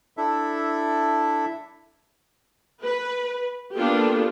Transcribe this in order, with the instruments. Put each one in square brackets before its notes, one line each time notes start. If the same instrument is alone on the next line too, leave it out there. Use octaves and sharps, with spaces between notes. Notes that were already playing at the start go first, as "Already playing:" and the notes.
[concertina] D4 E4 A4 E5
[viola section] B4
A#3 B3 D4 F4 G4 A4